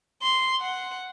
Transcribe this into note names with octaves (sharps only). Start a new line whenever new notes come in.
C6
F#5